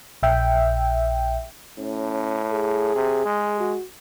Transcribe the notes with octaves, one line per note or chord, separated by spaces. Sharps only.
A#1 E5 G5
A2 C#4
G#4
C3
G#3
F#4